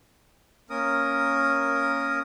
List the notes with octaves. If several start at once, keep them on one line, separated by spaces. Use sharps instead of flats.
A#3 C#4 A#4 D#6